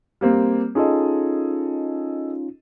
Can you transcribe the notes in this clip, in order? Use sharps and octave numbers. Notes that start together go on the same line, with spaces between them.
G3 A#3 C4
C#4 D#4 F4 G#4 A4 D#5